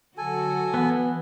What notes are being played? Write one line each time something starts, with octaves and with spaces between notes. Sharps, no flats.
D3 F#3 F#4 A4 G#5
E3 B3